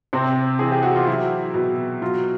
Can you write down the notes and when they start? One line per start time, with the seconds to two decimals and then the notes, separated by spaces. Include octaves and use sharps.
0.13 C3 C4
0.59 E3 G#4
0.72 G4
0.83 F#4
0.96 F4
1.07 F#3 E4
1.54 B2
2.02 F#3 F4